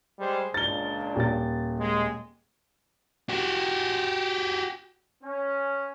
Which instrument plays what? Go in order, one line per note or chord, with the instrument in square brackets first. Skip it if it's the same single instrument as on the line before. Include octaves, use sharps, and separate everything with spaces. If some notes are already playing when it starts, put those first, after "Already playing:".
[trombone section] G3 G#3 C5
[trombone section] C#2 A#2 D4 [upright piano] A6 G7
[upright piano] D#1 A6
[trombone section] G#3
[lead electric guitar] F#4 G4
[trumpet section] C#4